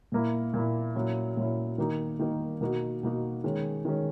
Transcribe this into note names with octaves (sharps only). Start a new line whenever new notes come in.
A#2 A#3 E4
A#2 A#3 E4
A#2 F#3 C#4 E4
A#2 F#3 C#4 E4
D#3 A#3 D#4
D#3 A#3 D#4
B2 A#3 D#4 F#4
B2 A#3 D#4 F#4
D#3 G#3 C#4
D#3 G#3 C#4